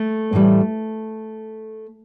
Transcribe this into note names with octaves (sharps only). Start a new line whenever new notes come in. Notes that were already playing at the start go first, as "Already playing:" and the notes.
Already playing: A3
A2 E3 G3